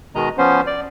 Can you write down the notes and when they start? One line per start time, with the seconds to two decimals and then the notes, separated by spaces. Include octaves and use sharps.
0.15 B2 D#3 G#3 D#5 A#5
0.38 F3 B3 C#4 C5
0.67 D5